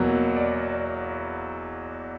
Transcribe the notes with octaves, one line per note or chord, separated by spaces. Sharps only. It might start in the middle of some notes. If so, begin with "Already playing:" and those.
Already playing: E2 B2 F#3 A#3
D5